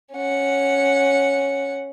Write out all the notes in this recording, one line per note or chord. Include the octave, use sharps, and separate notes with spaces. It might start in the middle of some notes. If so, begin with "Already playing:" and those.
C#4 F#5